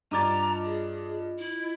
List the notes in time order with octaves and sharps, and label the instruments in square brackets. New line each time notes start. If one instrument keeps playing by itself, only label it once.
[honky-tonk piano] G2 D6 A6 [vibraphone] F4 D#5 [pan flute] A#5
[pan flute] G#4
E4